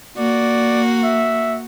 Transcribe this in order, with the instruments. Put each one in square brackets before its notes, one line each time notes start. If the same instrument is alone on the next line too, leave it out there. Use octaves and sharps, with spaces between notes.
[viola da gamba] A#3 F#4 [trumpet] D5
[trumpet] E5